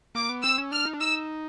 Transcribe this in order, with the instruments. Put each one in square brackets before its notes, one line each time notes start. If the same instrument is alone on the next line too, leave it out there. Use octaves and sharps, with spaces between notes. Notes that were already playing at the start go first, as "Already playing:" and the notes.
[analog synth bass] A#3 [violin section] D6
[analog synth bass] B3
[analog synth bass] C4 [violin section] E6
[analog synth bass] C#4
[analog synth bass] D4 [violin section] F6
[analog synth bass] D#4
D4
[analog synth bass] D#4 [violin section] E6